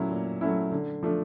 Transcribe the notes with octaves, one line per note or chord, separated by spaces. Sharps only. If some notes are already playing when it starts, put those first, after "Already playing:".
Already playing: A#2 F#3 A3 C#4 E4
A#2
F#3 A3 C#4 E4
D3
F3 A3 D4